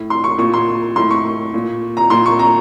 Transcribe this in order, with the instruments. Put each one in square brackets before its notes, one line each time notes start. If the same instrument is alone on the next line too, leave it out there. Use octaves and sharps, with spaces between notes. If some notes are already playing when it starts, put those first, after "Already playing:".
Already playing: [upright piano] A2
C6
C#6
A#2 C#6
C6
A2 C6
C#6
A#2
A#5
A#2 C6
C#6
A#5